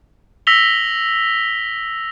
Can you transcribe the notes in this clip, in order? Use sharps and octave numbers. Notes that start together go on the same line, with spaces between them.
E6 A#6 B6 F7 G7